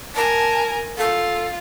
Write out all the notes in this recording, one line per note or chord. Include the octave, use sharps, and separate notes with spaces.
A#4 G#5 A5
F4 A4